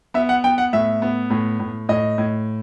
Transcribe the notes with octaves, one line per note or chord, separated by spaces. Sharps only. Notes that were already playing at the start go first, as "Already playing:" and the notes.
B3 E5
F#5
B3 G5
F#5
A2 E5
B3
A2
A2
A2 D#5
A2